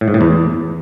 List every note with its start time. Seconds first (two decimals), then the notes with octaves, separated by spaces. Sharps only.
0.01 A2
0.08 G#2
0.14 A2
0.21 E2